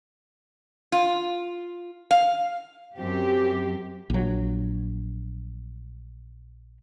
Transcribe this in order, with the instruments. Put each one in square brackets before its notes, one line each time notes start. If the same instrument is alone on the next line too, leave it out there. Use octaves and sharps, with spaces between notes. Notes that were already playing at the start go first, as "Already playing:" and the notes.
[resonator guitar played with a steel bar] F4
F5
[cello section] F#2 C4 G4
[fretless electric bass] A#1 F#3